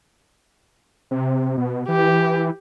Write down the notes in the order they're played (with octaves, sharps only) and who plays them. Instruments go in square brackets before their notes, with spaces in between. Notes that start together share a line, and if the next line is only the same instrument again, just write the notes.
[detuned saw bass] C3
B2
[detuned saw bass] E3 [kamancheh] G4